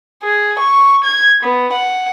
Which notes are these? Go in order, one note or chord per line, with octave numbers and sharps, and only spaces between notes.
G#4
C#6
G#6
B3
F#5